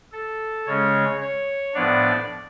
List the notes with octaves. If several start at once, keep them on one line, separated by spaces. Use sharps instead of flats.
A4
C#3 G#3 C#4 C#5
C#5
A2 F3 B3 D4 D5